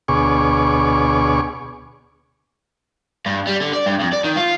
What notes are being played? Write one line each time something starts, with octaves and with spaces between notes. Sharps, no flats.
D2 B2 G#4 C#5 C#6 D6
G2
G3
D3
D5
G2
F2
D5
D#3
F4